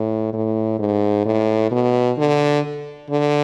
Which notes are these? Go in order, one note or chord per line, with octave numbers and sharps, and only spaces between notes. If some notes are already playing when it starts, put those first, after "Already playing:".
Already playing: A2
A2
G#2
A2
B2
D3
D3